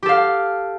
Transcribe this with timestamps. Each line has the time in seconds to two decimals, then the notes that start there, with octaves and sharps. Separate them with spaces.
0.03 G4
0.06 A4
0.09 F5